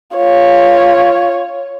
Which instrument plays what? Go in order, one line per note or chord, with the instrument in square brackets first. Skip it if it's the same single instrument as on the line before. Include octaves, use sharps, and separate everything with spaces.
[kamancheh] F4 C#5